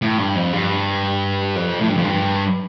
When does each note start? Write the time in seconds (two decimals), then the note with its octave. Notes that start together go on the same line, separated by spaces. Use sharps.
0.02 A2
0.18 G2
0.36 F2
0.53 G2
1.56 F2
1.81 A2
1.89 G2
1.97 F2
2.05 G2